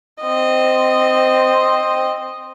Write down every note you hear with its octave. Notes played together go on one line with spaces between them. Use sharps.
C4 D#5